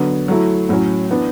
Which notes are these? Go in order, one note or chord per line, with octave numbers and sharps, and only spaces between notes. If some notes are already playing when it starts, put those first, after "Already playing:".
Already playing: D3 F#3 B3 D4
F#3 A3 E4
A2 F#3 C#4
E3 B3 D4